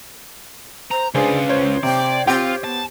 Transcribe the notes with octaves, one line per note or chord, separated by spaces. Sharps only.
C5 A#5
C#3 D4 F4 G#4 B4 C5
C5 C#5
C3 D5 G5
C4 F4 G4 G5
B3 A5